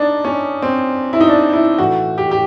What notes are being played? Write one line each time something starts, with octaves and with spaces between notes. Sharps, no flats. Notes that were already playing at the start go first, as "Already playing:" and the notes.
Already playing: D4 D#4
C#4
C4
E4
D#4
D4
E4
A2 E3 F#4
G4
G4